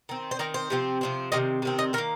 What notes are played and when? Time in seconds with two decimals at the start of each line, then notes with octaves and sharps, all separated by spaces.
0.09 D#3 C4
0.31 C5
0.39 D#3 C4 A#4
0.54 C5
0.70 C3 F3 C4
1.01 C3 F3 C4
1.32 C3 D#3 C4 D#5
1.62 C3 D#3 C4
1.79 D#5
1.93 D#3 A#4
1.98 A#3